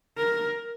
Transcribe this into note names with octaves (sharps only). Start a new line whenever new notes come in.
A#4